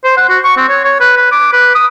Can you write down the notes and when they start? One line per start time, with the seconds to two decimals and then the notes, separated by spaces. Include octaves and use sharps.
0.04 C5
0.17 F#5
0.29 F#4
0.45 C#6
0.57 C4
0.69 C#5
0.85 C#5
1.00 B4
1.17 B4
1.32 D6
1.53 B4
1.75 D#6